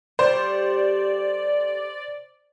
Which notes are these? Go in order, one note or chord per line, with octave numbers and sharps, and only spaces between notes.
G3 A3 G4 C5 D5